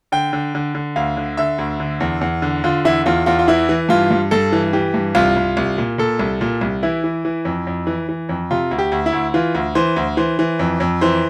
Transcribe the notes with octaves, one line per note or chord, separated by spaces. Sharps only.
D3 G5
D3
D3
D3
D2 F5
D3
D3 E5
D2
D3
E2
E2
D3
D3 F4
E2 E4
E2 F4
E2 F4
F4
E3 E4
E3
G2 F4
G2
G2 A4
E3
E3 G4
G2
C2 F4
C2
C2
A#2
A#2 A4
C2
A#2
C2
E3 E4
E3
E3
F2
F2
E3
E3
F2
C3 F4
D2
G4
D2
E4
D2
E3 F4
D2
E3 C5
D2
E3 C5
E3
F2
F2
E3 C5